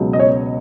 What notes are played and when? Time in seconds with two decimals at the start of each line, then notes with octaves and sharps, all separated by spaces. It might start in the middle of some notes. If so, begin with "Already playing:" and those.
Already playing: C#2 B2 F#3
0.13 D#5
0.20 C#5